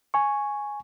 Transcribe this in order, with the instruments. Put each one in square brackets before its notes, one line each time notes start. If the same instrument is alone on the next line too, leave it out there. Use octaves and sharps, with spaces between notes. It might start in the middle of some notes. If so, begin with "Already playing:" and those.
[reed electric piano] G#5 C#6